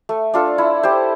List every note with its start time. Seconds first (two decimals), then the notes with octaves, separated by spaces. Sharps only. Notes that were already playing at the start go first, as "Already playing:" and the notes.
0.09 A3
0.34 D4 F4 A4
0.58 E4
0.83 G4 C5